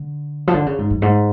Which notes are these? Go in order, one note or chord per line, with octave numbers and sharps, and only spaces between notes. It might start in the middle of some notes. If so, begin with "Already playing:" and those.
Already playing: D3
F3
D3
C#3
G#2
F#2
G#2